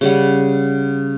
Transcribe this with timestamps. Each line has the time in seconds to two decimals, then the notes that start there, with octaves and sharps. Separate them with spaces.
0.01 C#3 G3 F#5